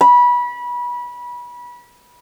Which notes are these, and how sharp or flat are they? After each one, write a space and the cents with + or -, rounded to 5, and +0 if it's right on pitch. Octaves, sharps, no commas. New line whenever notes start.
B5 -25